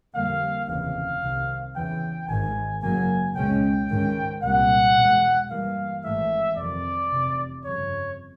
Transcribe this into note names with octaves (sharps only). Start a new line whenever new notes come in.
F2 D3 G3 A#3 F5
F1 D#2 C#3 E3 F5
C2 C3 D#3
E2 C#3 E3 G5
G#1 G#2 D#3 G#5
F#1 F#2 C#3 F#3 A#3 G#5
C#2 B2 G#3 C#4 G5
G#2 D#3 G#3 C#4
C2 A#2 G3 A#3 F#5
E2 B2 G#3
G2 E3 G3 A#3 F5
G#1 G#2 E3 A3 E5
F2 C3 D#3 D5
F1 E2 C3
G1 F2 C#3 C#5